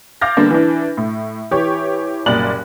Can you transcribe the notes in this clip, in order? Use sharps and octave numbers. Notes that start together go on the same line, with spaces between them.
F5 D6 F6 G6 A6 A#6
D3 G3 A#3 B3 D4
E3 D4
A2
E3 G4 C#5
F#1 C2 A#2 D5 F#6 F#7